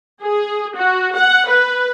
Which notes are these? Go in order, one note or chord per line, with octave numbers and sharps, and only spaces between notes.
G#4
F#4
F#5
B4